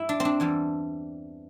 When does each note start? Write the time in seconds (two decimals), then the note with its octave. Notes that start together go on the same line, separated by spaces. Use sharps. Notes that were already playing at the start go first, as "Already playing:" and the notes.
Already playing: G2 E4
0.09 D4
0.20 C4
0.25 D4
0.40 E2 E3 G3